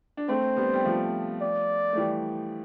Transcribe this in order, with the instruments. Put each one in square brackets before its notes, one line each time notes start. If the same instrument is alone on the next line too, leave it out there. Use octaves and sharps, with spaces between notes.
[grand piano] D4
[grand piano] A3 C4 [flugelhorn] C5
[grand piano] G3 B3
G3
F3 A3
[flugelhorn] D5
[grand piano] A3
E3 G3